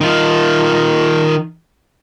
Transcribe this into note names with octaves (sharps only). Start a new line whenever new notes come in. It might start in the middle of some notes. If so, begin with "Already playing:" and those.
D#3 F4